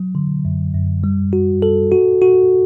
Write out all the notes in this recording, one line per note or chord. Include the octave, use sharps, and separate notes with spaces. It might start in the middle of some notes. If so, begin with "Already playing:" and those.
Already playing: F#3
D3
F#2
F#2
G3
F#4
A4
F#4
F#4